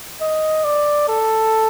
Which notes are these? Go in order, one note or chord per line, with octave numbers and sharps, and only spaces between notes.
D#5
D5
A4